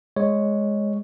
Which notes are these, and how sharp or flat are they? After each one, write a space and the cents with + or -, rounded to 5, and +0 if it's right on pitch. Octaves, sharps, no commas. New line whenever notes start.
G#3 +0 C#5 +0